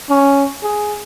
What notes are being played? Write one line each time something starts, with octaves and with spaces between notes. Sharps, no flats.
C#4
G#4